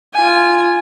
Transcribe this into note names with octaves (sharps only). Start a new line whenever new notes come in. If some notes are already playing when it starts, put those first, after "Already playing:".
F4 G#5